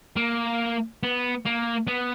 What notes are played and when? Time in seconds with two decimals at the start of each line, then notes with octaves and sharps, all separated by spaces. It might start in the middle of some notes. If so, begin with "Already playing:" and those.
0.17 A#3
1.03 B3
1.46 A#3
1.88 B3